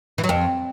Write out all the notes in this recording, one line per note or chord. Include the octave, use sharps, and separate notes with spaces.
E3
F#3
F2